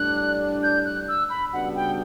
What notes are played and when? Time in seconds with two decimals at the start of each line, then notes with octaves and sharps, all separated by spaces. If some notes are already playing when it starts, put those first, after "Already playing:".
Already playing: A2 G3 D4 F#6
0.63 G6
0.85 F#6
1.08 E6
1.30 B5
1.52 C#3 G3 B3 D4 F#4 F#5
1.75 G5